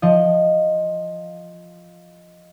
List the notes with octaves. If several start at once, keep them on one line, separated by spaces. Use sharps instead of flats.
F3 D#5